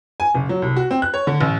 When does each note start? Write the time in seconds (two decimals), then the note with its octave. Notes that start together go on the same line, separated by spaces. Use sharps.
0.20 G#5
0.35 F#1
0.49 F#3
0.62 C2
0.76 F#4
0.91 C4
1.02 F#6
1.14 C#5
1.27 D3
1.41 A1